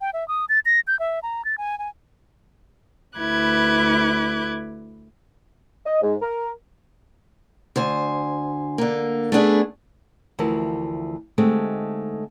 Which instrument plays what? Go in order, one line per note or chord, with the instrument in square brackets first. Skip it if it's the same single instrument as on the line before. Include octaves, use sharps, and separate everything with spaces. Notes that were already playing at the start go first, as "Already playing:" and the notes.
[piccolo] G5
E5
D#6
A6
A#6
G6
E5
A#5
A6
G#5
G#5
[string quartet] D2 E4 B4 D6 F#6 G#6
[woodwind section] D#5
G#2
A#4
[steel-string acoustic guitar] D2 C5 G#5
D3 A#3
A3 B3 D4 G#4
[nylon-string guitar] D2 E3 F3 F#4 A#4 A5
D3 G#3 A3 C4 D#4 G4